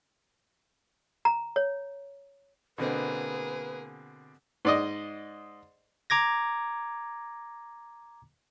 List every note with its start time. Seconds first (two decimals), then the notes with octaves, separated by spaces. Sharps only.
1.25 A#5
1.56 C#5
2.78 B2 D3 A#3 C4 G#4 B4
4.65 G#2 D5 D#5
6.10 A#5 D6 G#6 A#6